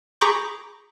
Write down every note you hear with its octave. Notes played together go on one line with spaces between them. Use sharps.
G#4 A#5 B5 C#6 D6 G6